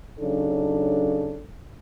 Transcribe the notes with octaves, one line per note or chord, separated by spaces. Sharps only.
C#3 F#3 D4 D#4 A4